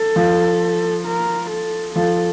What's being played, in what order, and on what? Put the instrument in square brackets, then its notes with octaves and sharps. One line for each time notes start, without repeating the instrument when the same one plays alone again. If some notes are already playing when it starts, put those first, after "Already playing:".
Already playing: [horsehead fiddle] A4
[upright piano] F3
[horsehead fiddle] A#4
A4
[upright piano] F3 [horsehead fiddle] A4